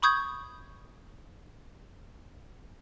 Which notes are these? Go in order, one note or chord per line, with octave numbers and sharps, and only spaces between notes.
B5 C#6 D#6 G6 G#6